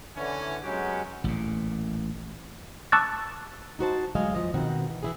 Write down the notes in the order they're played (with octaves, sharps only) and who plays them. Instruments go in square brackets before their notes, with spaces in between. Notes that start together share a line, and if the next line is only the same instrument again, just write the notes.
[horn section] D3 E3 C#4
F#3 G#3 B3 C#4 F#4 G4
[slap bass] A1 A#2
[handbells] A5 C#6 D6 E6 F#6 A6
[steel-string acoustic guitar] D#4 F#4 C5 A5
D2 F#3 G#3 D#5 F5 G#5
E2 C3 F3 D#5
B2 D#3 C4 F#5
E3
E3 E4 G#4